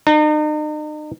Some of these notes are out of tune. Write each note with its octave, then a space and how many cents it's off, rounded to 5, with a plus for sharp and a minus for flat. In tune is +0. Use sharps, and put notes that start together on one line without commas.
D#4 -40